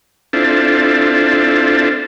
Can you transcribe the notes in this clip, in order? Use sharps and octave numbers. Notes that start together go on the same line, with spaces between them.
C4 D4 E4 F4 A4